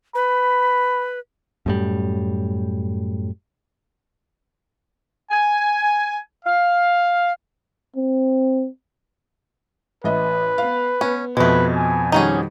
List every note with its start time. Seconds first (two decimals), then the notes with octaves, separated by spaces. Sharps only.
0.15 B4 B5
1.66 F#2 A2 G3
5.31 G#5
6.46 F5
7.96 C4
10.04 A1 B4 D#5 E5
10.58 B3 F5
11.01 B3 C#4
11.37 F2 B2 G#3 A3 B4
11.76 G#5
12.12 D#3 G3 C#4 D#4 F#4 G#4